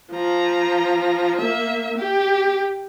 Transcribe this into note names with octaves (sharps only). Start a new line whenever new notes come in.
F3 A#5
A#3 E5
G4